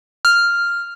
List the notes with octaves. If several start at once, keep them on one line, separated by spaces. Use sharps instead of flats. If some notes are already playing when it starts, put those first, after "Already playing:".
F6